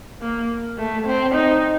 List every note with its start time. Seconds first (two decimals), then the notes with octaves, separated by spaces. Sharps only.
0.22 A#3
0.78 A3
1.06 C4
1.35 D#4